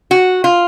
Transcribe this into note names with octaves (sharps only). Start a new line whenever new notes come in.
F#4
F4